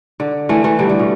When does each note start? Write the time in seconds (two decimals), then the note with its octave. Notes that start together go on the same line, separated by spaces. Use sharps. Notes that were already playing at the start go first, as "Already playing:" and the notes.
0.20 D3
0.49 E3 A3
0.64 E3 A3
0.79 D3 G3
0.89 D3
0.99 B2